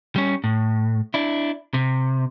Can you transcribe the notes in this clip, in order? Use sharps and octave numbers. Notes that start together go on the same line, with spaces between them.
G3 C#4
A2
D4 E4
C3